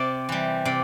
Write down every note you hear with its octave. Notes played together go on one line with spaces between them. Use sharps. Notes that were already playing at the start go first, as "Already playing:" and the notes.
Already playing: C3 D5
E3 G3
C3 D5